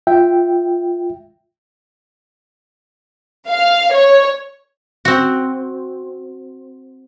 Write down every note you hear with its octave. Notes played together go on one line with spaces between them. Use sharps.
F4 E5 G5
F5
C#5
C4 F#4